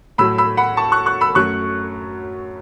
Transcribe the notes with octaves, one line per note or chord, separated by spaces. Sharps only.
A2 F#3 A3 B5 E6
B5 E6
F#5 B5
A5 C#6
C#6 F#6
C#6 F#6
B5 E6
F#2 F#3 A3 C#6 F#6